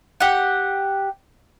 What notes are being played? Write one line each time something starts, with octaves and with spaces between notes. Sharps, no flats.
G4 F#5